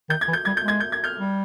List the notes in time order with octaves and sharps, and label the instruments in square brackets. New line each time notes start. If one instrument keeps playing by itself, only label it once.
[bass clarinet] D#3 [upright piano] G6
[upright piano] G#6
[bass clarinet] E3
[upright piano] G6
[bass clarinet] G3 [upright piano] G#6
[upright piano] G6
[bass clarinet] G#3 [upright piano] G#6
[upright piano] G6
G#6
F6 G6
[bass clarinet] G3